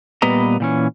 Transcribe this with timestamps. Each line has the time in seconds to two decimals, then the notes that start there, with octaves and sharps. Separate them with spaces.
0.22 A#2 G3 B3 B4 D#5 A#5
0.60 A#2 E3 C#4